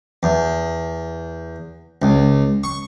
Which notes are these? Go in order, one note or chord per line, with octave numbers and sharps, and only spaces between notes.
E2
C#2
C#6